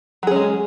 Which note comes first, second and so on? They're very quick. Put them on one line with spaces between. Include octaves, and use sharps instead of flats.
F#3 G#4 C#4 G#3